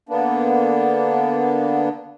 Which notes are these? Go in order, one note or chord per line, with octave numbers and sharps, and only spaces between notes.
D3 A#3 B3 D4